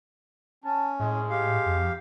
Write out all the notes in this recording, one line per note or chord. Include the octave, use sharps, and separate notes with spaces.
C#4 A5
A2 G#3
G4 F5
F2